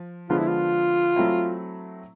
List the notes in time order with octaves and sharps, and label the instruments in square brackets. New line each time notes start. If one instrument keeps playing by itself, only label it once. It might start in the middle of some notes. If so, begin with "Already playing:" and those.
Already playing: [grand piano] F3
[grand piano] D3 F3 G#3 B3 [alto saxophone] F4
[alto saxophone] E4
F4
[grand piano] F#3 A3 C4 E4